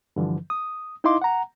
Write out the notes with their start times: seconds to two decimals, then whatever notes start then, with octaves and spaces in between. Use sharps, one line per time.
0.16 G2 D3 E3 F3
0.50 D#6
1.04 D#4 E4 D#5 F5 C6 D6
1.22 F#5 A#5